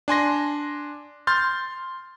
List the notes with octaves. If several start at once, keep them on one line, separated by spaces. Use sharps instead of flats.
D4 G#5 C6 A#6
C6 F6 G6 A6